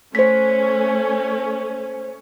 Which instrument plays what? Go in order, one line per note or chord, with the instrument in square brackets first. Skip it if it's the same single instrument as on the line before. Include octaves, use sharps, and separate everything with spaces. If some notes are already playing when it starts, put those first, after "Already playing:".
[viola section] A3 C#4 [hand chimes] C5 B6